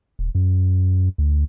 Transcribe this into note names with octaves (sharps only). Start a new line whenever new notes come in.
D#1
F#2
D2